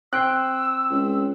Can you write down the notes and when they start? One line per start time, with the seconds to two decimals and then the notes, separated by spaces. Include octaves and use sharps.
0.13 C4 G5 C6 E6 F#6
0.91 C#2